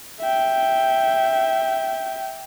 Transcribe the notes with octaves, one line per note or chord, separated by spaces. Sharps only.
E5 G5